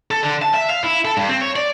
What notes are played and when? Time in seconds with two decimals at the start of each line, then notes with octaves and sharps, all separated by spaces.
0.11 A4
0.23 D3
0.42 A5
0.54 E5
0.70 F5
0.84 E4
1.05 A4
1.17 G2
1.29 C4
1.41 C#5
1.56 D5